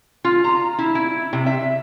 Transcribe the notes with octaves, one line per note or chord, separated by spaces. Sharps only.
F4
A#5
E4
E4
C3
E5